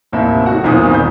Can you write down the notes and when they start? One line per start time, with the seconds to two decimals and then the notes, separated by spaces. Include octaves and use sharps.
0.12 A1 D#2 C3 E4 E5
0.46 A3 D#4 F#4 F#5
0.64 B1 E2 A#2 D#3 C4 D#6
0.90 E1 G6